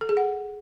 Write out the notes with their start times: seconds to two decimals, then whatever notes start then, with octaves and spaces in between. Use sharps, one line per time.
0.01 A4
0.09 G#4
0.17 F#5